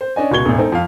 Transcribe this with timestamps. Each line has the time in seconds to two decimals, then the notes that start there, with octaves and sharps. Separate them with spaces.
0.01 C5
0.16 C#4 D4 D#5 G#5
0.31 C#2 B2 C#6 G#6 G7
0.45 E1 A1
0.58 C4 D#4 A4
0.72 F2 F5